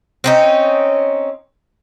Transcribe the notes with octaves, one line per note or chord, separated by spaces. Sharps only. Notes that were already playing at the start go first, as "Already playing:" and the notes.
C4 C#4 D#4